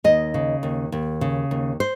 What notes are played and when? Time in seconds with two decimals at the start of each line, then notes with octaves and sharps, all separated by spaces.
0.04 D#2 D#5
0.34 C#3
0.63 D#2
0.92 D#2
1.21 C#3
1.51 D#2
1.80 C5